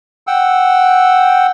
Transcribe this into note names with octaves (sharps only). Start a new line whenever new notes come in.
F#5 G5 E6